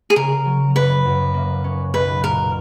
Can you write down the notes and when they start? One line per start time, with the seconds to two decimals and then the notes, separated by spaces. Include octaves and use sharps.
0.10 G#4
0.16 C#3 A#4
0.46 F#3
0.75 F#1 B4
1.05 F#2
1.34 A#3
1.64 C#4
1.94 B1 B4
2.23 A#2 A#4